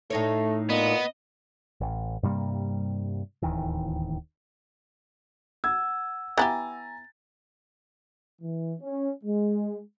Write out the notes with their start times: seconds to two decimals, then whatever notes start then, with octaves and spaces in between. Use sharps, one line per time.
0.10 A2 A3 D#4 C#5
0.69 A#2 B3 D#5
1.81 A1
2.23 G2 C3 G3 A#3
3.42 D1 D#2 D#3 E3
5.64 F#5 E6 G#6
6.37 B3 E4 G4 G#5 A#5 A6
8.42 E3
8.81 C#4
9.24 G#3